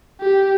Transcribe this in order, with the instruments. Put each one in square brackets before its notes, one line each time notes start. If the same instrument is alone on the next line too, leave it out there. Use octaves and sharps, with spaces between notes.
[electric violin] G4